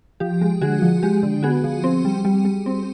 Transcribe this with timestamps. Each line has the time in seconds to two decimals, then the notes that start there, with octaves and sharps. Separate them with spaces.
0.20 F3 G4
0.41 G#3
0.61 D3 F#4 G#4
0.82 F3
1.03 G#3 G4
1.23 D3
1.43 B3 F#4 G#4
1.64 F3
1.84 C4
2.05 G3
2.25 G3
2.45 G3
2.66 C4